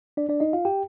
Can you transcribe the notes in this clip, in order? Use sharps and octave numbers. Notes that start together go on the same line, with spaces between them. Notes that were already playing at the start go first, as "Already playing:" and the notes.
D4 D5
D4 D5
D#4 D#5
F4 F5
G4 G5